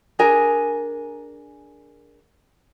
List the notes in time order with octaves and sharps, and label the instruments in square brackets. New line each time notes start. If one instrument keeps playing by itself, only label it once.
[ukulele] D4 G#4 A#4 G#5